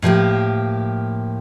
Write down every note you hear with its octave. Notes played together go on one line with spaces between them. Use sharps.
A2 F3 A#3 G4